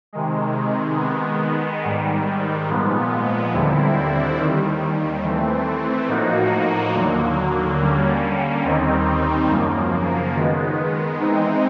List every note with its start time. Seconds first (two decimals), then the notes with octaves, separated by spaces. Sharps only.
0.13 C3 D#3 G#3
0.97 D#3 G#3 B3
1.83 G#2 D#3 G3
2.68 A#2 F3 G#3 B3
3.54 D#2 D3 G3 C4 E4
4.38 D#2 D#3 G3
5.24 E3 A3 C4
6.08 A2 F3 A#3 D#4 F#4
6.94 D#2 D3 F#3 A#3
7.79 D3 G3 A#3 C#4
8.64 D#2 D#3 G3 C4 D#4
9.49 F#2 C#3 F3 A#3
10.34 D#3 G#3 B3
11.20 E3 G#3 C4 D#4